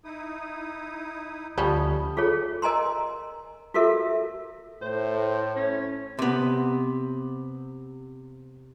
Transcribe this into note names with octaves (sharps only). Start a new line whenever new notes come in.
D#4 E4 D#6
D2 F3 G3 C#4 A5 B5 D#6
F4 G#4 A4 C#5
A#4 D#5 G#5 A#5 C6
F4 F#4 A4 A#4 E5
A2 C5
C#4
C3 B3